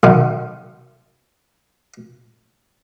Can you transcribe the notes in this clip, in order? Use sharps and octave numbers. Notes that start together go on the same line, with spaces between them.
B1 D#3